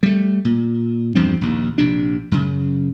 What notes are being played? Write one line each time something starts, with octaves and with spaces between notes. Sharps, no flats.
G3 A3
A#2
E2 G2 F3 C4
A#1 D#2
A#1 C3 D4
F#2 C#3